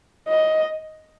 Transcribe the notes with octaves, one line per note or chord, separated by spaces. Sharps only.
D#5